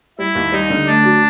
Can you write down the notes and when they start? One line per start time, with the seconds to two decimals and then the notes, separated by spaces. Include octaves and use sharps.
0.18 G3 E4
0.35 D#2
0.52 G3 D#4
0.70 D3
0.86 A3 D4
1.04 F#3